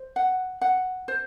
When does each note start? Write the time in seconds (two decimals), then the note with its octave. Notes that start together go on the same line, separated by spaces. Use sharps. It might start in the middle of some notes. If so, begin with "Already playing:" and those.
Already playing: C5
0.16 F#5
0.61 F#5
1.08 C5